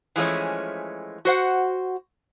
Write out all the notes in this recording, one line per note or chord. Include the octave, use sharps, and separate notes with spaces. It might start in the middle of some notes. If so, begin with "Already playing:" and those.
E3 F3 G#3 A3 C#4
F#4 C5 F#5